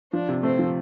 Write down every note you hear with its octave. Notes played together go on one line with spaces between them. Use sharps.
F3 D4
C3
A3 C4
F3